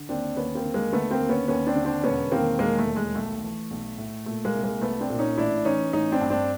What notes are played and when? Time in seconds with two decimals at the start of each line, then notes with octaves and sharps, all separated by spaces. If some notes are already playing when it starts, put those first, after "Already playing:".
Already playing: D3
0.09 D#2 C4 D4
0.36 D#2 B3 C#4
0.55 A#3 C4
0.65 D3
0.74 G#3 A#3
0.93 D3 A3 B3
1.11 A#3 C4
1.20 D#2
1.29 B3 C#4
1.48 D#2 B3 C#4
1.67 C4 D4
1.76 D3
1.85 C4 D4
2.03 E1 B3 C#4
2.31 D#3 A#3 C4
2.59 E1 G#3 A#3
2.79 A3
2.87 D#2
2.96 G#3
3.15 B1 A3
3.44 E3
3.71 B1
3.98 A2
4.26 A#2 A3
4.45 G#3 A#3
4.54 C2
4.64 G#3 A#3
4.82 C2 A3 B3
5.01 C4 D4
5.10 A#2
5.19 C#4 D#4
5.37 A1 D4 E4
5.65 E3 C#4 D#4
5.93 A1 C#4 D#4
6.12 C4 D4
6.21 G2
6.30 C4 D4